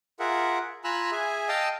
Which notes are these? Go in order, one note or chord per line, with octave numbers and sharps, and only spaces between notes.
F4 G#4 A#4 E5 F#5
F4 G#5 A#5 B5 E6 F#6
G#4 E5 G#5
D#5 F5 G5 A5 D#6 E6